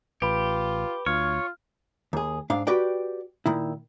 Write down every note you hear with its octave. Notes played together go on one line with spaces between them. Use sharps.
A1 F4 G4 B4 B5
D2 F4 C#5 F6
D#2 G#4
G#2 D4 F5
F#4 G4 B4 D5 G5
A#2 D#3 E4